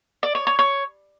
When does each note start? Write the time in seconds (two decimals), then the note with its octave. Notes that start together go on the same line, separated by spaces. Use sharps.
0.23 D5
0.35 C#5
0.47 C#5
0.59 C#5